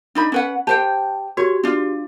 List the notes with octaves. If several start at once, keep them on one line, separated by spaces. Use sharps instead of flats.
D4 D#4 B5
C#4 B4 F#5
G4 C5 G5 A5
F#4 G4 C#5
D4 F4